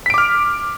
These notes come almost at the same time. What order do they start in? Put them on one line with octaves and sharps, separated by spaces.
B6 D7 D6 F6